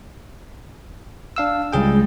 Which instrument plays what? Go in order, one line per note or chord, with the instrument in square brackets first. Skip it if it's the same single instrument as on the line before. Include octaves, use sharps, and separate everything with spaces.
[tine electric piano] D4 F5 E6
[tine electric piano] C#2 G#4 G5 [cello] G3 G#3